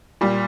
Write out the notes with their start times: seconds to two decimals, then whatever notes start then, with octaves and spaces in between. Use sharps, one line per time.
0.21 A#2 G3